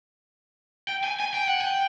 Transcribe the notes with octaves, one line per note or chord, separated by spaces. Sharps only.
G5
G#5
G#5
G5
F#5
G5